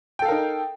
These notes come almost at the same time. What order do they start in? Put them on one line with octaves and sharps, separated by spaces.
G5 A4 F5 A#4 D#4